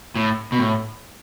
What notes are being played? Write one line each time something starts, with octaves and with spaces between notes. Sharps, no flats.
A2
B2
A2